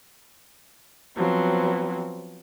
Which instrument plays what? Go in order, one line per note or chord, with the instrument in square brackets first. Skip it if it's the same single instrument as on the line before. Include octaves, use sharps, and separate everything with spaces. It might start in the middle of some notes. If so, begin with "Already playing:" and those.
[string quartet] F3 F#3 B3 C4